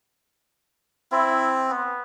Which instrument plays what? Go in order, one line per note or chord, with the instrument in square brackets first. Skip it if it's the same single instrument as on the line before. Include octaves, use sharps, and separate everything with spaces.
[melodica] C4 [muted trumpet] E4
[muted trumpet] B3